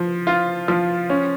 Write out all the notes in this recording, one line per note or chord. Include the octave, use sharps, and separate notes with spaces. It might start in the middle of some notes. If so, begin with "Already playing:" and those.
Already playing: F3
F4
F3
C#4